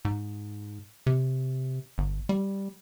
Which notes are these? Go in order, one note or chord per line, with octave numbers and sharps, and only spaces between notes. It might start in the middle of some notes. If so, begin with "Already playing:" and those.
G#2
C3
G1
G3